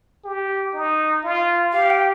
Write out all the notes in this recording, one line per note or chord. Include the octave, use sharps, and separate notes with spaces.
G4
D#4
F4
G4 F5
G5